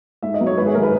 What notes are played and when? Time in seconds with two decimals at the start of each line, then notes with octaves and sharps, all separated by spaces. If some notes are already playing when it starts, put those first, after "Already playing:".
0.23 G#2 E5
0.34 D#5
0.40 F#3 B3
0.47 C#5
0.58 G#1 B4
0.66 G#4
0.75 D#3 F#3 A#4
0.83 B4